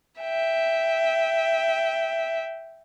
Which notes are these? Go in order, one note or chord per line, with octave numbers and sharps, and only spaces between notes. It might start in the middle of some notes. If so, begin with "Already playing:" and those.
E5 G5